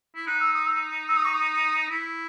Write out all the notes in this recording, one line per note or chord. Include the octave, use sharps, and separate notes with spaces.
E4
D#4 F#6
E6
D#6
E6
E6
D#6
C#6
D#6
E4